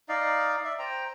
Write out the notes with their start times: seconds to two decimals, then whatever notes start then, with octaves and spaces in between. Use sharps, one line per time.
0.09 D#4 D5 D#5 F5
0.64 D5 E5
0.79 C5 G5 A#5